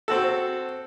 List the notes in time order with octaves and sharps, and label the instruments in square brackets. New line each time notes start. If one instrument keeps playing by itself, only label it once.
[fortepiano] C4 F#4 A4